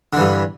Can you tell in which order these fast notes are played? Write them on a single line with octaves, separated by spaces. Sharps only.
D3 E3 G2